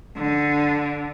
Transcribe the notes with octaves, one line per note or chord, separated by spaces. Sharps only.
D3